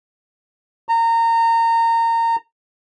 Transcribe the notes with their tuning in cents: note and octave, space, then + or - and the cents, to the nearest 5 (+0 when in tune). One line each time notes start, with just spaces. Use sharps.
A#5 -25